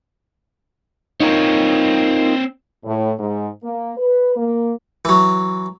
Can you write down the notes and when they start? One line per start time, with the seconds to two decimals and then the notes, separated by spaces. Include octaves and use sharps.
1.20 C4 D#4 F4 A#4 C#5
2.85 A2
3.19 G#2
3.64 A#3
3.98 B4
4.36 A#3
5.05 E3 F#3